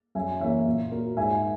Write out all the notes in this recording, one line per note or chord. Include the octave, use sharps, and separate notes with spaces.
F#2 E5 G#5
E3 A#3 C#5 E5
A#2
A#3 F#4 A#4
G#2 E5 G#5